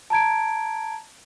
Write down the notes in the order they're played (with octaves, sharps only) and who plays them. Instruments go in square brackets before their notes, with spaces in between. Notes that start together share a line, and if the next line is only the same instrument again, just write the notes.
[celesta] A5 A#5 G#6 D7